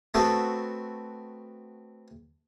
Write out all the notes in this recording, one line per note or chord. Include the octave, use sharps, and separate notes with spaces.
A3 B3 C4 F#4 A4